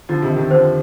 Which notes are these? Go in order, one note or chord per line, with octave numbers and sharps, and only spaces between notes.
D3 F3 F4
C3 D#3
D#5
C3 D#3
D3 F3 C5